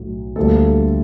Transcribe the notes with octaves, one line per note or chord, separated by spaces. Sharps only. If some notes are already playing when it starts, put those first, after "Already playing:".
Already playing: B1 A2 F#3
D2 D3 G3 A#3 A4